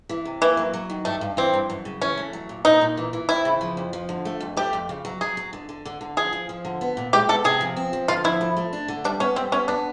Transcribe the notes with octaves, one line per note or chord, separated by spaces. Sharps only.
E3
C3
E3 A#3
F#3
F#3
D#3
G2 A3
G2
E3 C4
G2
F#2
C#3
E3 C#4
A3
F#3
A#2
A#2 D#4
A#2
E3
E3
C4 E4
C#3
F3
F2
F3
D3
A3
F2
A3 G4
F2
C#3
F#3
F#3 G#4
F#3
D3
D3
D3
D3
F3 G#4
F3
F3
D3
B3
A#2
G#3 G4
B3 A4
C3 G#4
F3
C4
F3
D3 F4
F3 E4
A3
A3
D4
D3
G3 D4
B3 C#4
G3 C4
B3 C#4
B3 D4